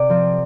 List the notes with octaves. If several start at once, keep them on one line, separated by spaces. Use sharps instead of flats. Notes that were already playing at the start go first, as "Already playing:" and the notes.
Already playing: C3 D5
F3 C4 F4